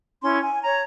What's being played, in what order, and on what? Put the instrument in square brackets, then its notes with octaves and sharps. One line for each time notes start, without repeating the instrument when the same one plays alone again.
[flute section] C#4 E4 C6
G#5
C#5 A#5